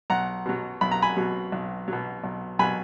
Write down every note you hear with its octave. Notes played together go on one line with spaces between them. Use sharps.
B1 F#5 A#5
B2 F#3
B1 B5
A#5
G#5 B5
B2 F#3
B1
B2 F#3
B1
B2 F#3 G#5 B5